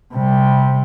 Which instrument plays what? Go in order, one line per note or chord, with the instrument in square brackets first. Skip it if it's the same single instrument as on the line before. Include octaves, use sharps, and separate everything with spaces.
[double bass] C3 G3